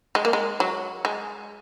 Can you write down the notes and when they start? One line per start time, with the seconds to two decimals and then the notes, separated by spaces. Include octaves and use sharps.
0.15 G#3
0.25 A#3
0.33 G#3
0.60 F#3
1.05 G#3